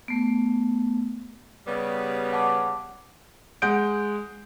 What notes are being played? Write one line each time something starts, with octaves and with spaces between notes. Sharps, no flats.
A3 B3
C#3 G3 B3
F#5 A5 D6
G#3 F#5 D#6 G6 D7